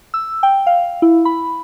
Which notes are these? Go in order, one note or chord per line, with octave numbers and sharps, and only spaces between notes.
E6
G5
F5
E4
B5